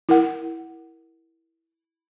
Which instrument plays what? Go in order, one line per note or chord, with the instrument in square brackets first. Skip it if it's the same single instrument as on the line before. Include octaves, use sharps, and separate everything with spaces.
[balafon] E4 A#4 F#5